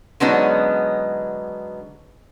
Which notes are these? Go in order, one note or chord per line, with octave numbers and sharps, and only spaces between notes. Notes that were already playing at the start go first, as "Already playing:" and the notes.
D3 F#3 G#3 B3 C#4 D#4